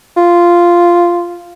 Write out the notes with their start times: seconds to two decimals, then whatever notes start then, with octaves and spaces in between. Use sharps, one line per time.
0.17 F4